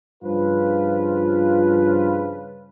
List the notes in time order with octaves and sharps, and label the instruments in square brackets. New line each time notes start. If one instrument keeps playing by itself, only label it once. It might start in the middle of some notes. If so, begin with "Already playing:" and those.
[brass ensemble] G2 C#3 F3 F4 B4